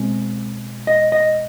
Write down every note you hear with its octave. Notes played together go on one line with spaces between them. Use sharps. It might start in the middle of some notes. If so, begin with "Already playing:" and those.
Already playing: B2 G#3 C4
D#5
D#5